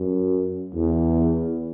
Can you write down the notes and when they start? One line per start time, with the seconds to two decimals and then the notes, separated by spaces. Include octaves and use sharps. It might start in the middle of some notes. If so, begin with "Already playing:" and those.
Already playing: F#2
0.74 E2